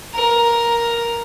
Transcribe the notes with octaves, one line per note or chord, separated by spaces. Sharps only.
A#4